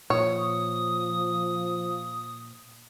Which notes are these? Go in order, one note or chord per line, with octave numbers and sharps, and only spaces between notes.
A#2 F3 C#5 D#6